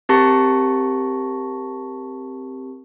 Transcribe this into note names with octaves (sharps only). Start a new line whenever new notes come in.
C4 G4 A#4 A5 C#6 A#6